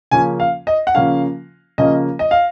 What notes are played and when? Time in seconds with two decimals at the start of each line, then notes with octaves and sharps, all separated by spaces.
0.11 C#3 F3 A#3 C#4 G#5
0.40 F5
0.67 D#5
0.87 F#5
0.95 C#3 F3 A#3 C#4 F5
1.78 C#3 F3 A#3 C#4 D#5
2.19 D#5
2.31 F5